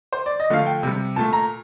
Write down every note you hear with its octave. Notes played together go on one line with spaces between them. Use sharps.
C5
D5
D#5
D3 F3 A3 F5
G5
C3 G3
A#2 A3 A5
A#5